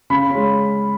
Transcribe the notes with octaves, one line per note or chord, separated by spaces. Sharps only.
C#3 B5
G#3 C#4